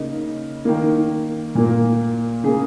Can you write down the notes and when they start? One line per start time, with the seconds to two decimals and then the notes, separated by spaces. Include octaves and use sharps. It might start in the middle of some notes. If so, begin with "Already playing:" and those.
Already playing: C#3 A#3 D#4
0.65 D#3 A#3
1.55 A#2 A#3
2.44 C#3 A#3 G#4